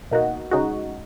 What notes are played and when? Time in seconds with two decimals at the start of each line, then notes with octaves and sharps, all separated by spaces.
0.11 B2 A#3 D#4 F#4
0.51 C#3 G#3 D#4 F#4